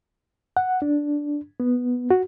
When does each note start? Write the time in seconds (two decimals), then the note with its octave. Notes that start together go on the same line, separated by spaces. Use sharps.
0.57 F#5
0.82 D4
1.60 B3
2.11 F#4